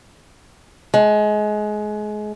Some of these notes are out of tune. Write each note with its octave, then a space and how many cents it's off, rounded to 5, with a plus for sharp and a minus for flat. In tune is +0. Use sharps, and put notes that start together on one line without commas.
G#3 +25